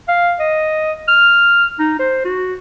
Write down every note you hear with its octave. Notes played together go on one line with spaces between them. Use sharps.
F5
D#5
F6
D#4
C5
F#4